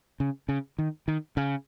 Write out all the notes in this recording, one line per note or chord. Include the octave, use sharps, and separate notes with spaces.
C#3
C#3
D#3
D#3
C#3